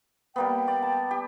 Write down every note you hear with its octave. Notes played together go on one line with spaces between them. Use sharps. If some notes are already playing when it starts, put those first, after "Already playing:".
G3 A#3 B3 G5
D5
A5
G4